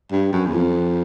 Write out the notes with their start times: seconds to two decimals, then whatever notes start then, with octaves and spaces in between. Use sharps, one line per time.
0.12 G2
0.33 F#2
0.46 E2
0.54 F2